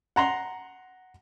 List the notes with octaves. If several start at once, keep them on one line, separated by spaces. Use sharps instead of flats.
F#5 A#5 C6